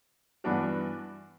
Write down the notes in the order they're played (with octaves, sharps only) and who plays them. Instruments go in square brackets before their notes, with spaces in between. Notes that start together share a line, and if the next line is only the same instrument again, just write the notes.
[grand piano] G2 E3 B3 D4 F#4